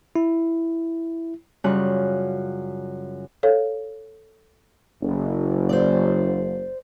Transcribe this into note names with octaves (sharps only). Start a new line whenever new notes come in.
E4
F#2 C#3 G3 C#4 F4 F#6
A4 C#5 F5
F#1
C5 D5